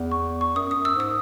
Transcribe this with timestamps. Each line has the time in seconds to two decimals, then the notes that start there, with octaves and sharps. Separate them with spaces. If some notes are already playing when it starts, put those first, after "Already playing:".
Already playing: E2
0.11 C#6
0.41 C#6
0.56 F#2 D#6
0.71 F#2 D#6
0.85 E6
0.95 G#2 D#6